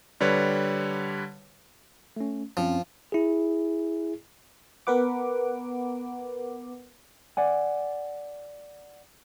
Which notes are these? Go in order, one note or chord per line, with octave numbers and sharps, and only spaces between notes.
D3 G3 B4 C#5
A3 C#4
F#2 F3 C4 C#4
E4 G#4
B3 A#4 B4 F#5 D6
D5 F#5 G#5